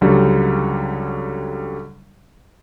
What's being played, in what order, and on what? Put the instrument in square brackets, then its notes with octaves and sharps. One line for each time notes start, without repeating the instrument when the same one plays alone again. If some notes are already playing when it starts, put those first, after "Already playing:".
[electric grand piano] C#2 D3 F#3 G3